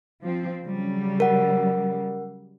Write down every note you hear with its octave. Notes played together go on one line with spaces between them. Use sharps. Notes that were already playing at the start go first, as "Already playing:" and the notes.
F3 C4
C#3 F#3 G3
A#4 F#5